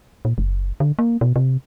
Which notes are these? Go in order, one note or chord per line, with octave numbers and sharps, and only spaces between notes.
A#2
F#1
D3
A#3
B2
C3